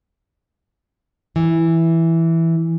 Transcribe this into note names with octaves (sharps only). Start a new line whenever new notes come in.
E3